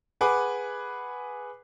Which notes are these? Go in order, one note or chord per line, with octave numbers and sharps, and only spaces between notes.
G#4 B4 F#5 G#5 D6